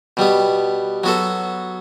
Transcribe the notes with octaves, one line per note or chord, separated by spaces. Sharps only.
B2 G3 B3
F#3 B3 F#4 A4